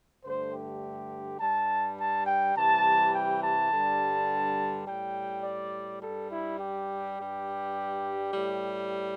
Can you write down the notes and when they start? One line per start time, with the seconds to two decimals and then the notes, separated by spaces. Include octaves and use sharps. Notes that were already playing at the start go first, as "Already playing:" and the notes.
0.24 G2 D3 A3 C5
0.53 G4
1.40 G2 G3 A5
1.98 A5
2.26 G5
2.55 C3 E3 G3 A5
3.13 G5
3.42 A5
3.71 G2 D3 G3
4.87 A2 G3 G5
5.44 D5
6.02 G2 G3 A4
6.31 E4
6.60 G4
7.18 G2 G3
8.33 A2 G3